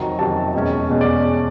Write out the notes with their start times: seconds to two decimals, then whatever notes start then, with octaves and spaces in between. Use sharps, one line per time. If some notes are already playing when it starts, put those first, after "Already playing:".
Already playing: F2 C3 D#3 F#3 A#5
0.19 F2 C3 D#3 F#3 A5
0.54 E2 B2 G#3 C#4
0.89 E2 B2 G#3 C#4
1.01 D5